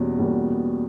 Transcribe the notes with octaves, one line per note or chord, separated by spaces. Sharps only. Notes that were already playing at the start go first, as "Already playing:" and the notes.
Already playing: E2 B2 G3 A#3 C#4
E2 B2 G3 A#3 C#4